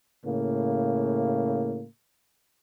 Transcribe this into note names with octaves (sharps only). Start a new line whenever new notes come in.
A2 C#3 A#3